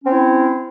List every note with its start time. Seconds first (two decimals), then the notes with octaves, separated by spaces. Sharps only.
0.03 C#4
0.06 C4
0.09 E4